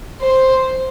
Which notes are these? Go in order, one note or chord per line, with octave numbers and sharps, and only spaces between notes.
C5